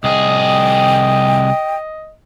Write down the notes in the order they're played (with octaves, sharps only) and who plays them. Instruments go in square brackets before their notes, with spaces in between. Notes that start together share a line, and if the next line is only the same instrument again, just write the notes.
[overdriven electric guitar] C2 G#4 [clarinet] D#5 [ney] G5